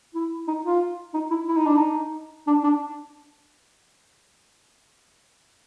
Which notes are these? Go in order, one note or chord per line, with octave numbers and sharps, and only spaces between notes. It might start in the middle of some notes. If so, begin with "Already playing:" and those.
E4
D#4
F4
D#4
E4
E4
D#4
D4
D#4
D4
D4